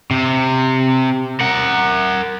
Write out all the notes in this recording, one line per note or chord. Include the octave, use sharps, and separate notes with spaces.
C3
A#4 F#5